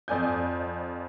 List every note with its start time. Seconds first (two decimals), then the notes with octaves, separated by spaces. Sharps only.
0.08 F2 D5 G#5 G6